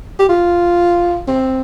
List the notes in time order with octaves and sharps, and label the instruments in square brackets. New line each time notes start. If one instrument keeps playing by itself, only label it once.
[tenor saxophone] G4
F4
C4